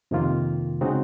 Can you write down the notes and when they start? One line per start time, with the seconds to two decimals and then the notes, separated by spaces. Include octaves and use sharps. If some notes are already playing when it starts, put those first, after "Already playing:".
0.11 F2 C3 D#3 A#3 F4
0.81 C#3 G#3 C4 D#4 F#4